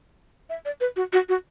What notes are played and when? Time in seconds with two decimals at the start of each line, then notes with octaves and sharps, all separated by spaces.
0.50 E5
0.65 D5
0.81 B4
0.96 F#4
1.13 F#4
1.29 F#4